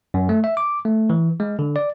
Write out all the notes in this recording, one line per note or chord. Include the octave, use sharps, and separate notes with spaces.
F#2
A3
E5
D6
A3
E3
G#3
D3
D5